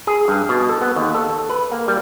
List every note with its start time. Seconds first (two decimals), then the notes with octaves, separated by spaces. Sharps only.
0.07 G#4
0.28 G2
0.49 B2
0.69 A4
0.81 B3
0.96 D#2
1.14 A4
1.50 B4
1.72 A#3
1.88 G3